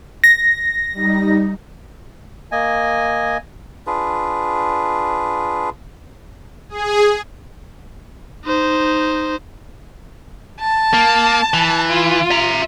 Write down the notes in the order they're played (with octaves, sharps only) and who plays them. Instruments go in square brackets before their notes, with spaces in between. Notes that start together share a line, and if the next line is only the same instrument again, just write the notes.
[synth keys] A#6
[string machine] G3 D#4
[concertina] A#3 D#5 G#5
[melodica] D4 F4 G#4 B4
[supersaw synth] G#4
[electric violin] D#4 C5
[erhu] A5
[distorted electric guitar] A#3
E3
[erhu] F4
[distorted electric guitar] E5 A#5